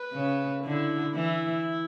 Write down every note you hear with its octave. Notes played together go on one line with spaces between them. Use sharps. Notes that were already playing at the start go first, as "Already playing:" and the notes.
Already playing: B4
C#3
D3 E4
E3 E4